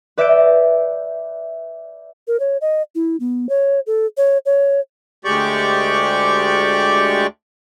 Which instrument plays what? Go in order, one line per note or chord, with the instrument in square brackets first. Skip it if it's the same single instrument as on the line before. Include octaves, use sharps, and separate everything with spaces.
[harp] B4 D5 E5 F#6 G6 D7
[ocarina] A#4
C#5
D#5
E4
B3
C#5
A4
C#5
C#5
[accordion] D2 G#3 G4 D5 C#6